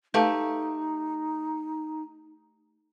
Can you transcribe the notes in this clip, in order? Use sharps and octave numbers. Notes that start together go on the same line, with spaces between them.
A3 D#4 G4 B4 F5 A5